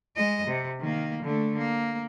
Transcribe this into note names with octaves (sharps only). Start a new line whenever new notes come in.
G#3 D#5
C3
D#3 A#3
D3 A3
A#3